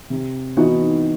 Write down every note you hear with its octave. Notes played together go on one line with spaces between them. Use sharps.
C3
E3 B3 D#4 F#4